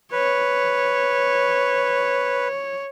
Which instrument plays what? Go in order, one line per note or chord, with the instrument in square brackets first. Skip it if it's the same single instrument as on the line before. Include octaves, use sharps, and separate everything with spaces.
[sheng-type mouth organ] B4 [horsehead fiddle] C#5